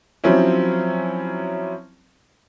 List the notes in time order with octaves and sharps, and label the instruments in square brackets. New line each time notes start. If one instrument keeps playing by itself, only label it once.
[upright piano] F3 F#3 C4 C#4 E4